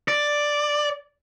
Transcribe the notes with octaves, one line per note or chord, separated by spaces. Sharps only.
D5